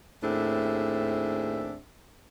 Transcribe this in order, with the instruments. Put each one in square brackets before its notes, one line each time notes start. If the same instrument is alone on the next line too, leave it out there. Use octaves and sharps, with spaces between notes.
[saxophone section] D#2 A2 C4 D4 G#4 E5